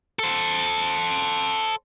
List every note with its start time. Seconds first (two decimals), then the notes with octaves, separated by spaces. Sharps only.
0.19 A4 C5